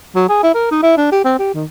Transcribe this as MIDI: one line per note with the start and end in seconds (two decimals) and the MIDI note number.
0.15 0.25 54
0.29 0.42 68
0.43 0.50 64
0.54 0.70 70
0.71 0.81 63
0.83 0.95 64
0.97 1.11 62
1.12 1.24 67
1.24 1.34 60
1.39 1.53 67
1.54 1.64 51